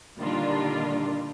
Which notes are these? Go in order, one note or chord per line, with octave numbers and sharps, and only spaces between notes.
A#2 D3 D#3 G3 D4 F4